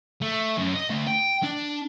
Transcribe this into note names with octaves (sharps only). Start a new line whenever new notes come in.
A3
F#2
D#5
D3 A3
G5
D4